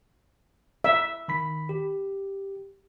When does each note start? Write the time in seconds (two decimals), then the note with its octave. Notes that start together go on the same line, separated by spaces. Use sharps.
0.84 E5
1.28 D#3 B5 B6
1.69 G4